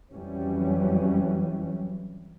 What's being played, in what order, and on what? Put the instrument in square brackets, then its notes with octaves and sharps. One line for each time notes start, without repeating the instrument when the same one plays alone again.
[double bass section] F2 E3 F#3 G3 C#4